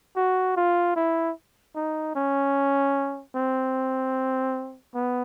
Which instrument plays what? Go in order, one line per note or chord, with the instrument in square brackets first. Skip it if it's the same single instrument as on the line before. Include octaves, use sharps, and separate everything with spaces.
[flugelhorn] F#4
F4
E4
D#4
C#4
C4
B3